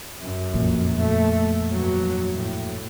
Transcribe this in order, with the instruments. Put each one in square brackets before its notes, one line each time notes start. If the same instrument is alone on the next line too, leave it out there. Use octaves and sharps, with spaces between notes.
[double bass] F#2
[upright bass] F2 A#2
[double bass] A3
G2 F#3
A2